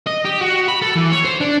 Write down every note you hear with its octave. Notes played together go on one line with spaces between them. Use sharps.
D#5
G4
F#4
B5
A4
E3
C#5
C5
D4